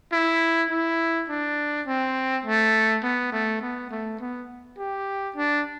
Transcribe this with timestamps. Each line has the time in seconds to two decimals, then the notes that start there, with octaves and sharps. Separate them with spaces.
0.12 E4
0.71 E4
1.29 D4
1.87 C4
2.45 A3
3.03 B3
3.32 A3
3.62 B3
3.91 A3
4.20 B3
4.78 G4
5.36 D4